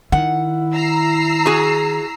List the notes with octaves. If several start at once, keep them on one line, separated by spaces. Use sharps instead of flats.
D#3 E4 F#5
A#5 E6 C7
F#4 G#4